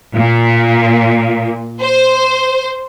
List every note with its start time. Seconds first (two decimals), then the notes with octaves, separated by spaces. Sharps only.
0.15 A#2
1.80 C5